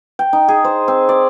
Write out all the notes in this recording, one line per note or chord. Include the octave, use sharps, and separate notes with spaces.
G5
D#4
G#4
C5
C4
D5